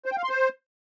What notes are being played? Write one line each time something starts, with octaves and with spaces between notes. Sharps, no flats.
C5
G5
F5
C6
C5